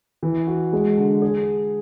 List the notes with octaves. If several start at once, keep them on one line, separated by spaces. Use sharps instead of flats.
E3
F#4
G#3
D3
G#4